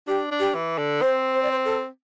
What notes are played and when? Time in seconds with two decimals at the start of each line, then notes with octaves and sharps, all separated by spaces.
0.07 D4 G4
0.31 D4
0.39 G4
0.55 E3
0.78 D3
1.02 C4 C5
1.33 C5
1.43 D5
1.51 C5
1.65 A4